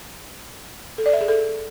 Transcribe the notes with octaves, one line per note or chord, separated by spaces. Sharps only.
A4
D5
E5
G#4
A4